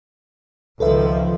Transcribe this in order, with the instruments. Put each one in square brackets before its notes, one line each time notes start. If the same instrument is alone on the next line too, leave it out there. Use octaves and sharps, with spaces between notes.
[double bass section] C#2 D#3 F3 [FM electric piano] A4 B4 E5